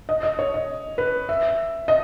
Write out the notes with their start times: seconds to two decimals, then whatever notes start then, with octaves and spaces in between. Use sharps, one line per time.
0.09 D#5
0.23 D#5
0.39 C#5
0.54 D#5
0.98 B4
1.29 E5
1.88 D#5